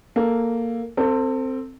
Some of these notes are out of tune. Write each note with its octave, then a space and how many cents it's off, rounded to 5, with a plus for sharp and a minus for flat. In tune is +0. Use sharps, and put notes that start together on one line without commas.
A#3 -5 A4 +0
C4 +0 A4 +30